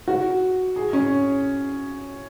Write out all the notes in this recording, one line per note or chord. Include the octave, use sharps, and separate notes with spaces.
F#4
G#4
C#4